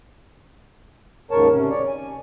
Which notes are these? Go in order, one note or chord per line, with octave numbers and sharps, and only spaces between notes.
D#2 G#2 C#3 A#4 C#5 A5
C3 C#4
C#5 D5
G#5